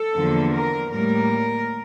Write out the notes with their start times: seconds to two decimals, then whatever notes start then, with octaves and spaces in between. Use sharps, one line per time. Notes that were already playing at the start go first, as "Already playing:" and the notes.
Already playing: A4
0.13 E2 D3 F3 A#3
0.53 A#4
0.92 A2 G3 A#3 A#4